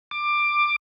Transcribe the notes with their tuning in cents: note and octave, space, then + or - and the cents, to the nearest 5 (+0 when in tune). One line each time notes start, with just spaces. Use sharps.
D6 +15